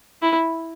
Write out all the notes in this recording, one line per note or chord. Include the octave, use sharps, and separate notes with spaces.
E4